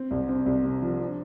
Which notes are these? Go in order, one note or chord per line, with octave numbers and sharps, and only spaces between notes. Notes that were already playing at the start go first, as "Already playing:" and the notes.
Already playing: C4
C2
C4
C2
C3
F3
D4